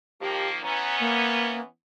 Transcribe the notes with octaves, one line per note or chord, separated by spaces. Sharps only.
D#3 F3 A#3 G4
E3 B3 C#4 A#5
A#3